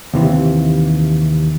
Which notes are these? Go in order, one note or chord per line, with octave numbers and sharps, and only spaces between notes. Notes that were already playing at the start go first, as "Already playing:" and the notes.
D#2 C3 E3